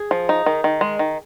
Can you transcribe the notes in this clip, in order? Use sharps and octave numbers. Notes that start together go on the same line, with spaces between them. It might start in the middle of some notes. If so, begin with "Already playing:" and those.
Already playing: G#4
F3
D#4
D#3
D#3
G#3
D#3